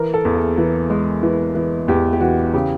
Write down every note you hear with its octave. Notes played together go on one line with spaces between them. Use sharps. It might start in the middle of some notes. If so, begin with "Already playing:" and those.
Already playing: E3 A#4
A4
E2
G#4
E3
G#3
E3
E3
E2 G4
G4
E3 F#4
C#3 G4